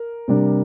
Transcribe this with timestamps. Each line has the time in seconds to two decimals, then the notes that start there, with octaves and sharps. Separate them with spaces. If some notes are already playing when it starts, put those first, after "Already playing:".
Already playing: A#4
0.28 C3 G3 A#3 D4